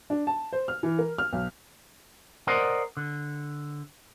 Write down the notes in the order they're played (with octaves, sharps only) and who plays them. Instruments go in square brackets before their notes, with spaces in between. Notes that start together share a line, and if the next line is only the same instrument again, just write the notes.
[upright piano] D4
A5
C5
F6
E3
A#4
F6
B1
[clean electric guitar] A#4 C5 D5 D#5 F#5
D3